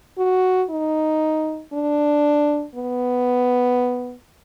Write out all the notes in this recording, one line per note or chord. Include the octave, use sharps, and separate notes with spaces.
F#4
D#4
D4
B3